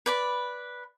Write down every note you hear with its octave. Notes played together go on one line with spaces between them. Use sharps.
B4 D5 B5